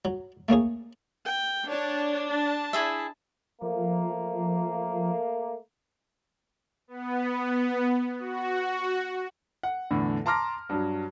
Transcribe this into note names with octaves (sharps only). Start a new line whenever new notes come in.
F#3
A3 A#3 C#4 G#4
G5
D4 C#5
A5
E4 G#4 E5
F3 A3 A#3
B3
F#4
F#5
E2 A2 D3
A5 A#5 C6 D6 F6 A#6
G2 F#3